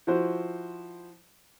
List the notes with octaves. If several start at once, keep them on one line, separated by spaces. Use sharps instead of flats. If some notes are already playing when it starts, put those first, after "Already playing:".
F3 E4 F#4 C5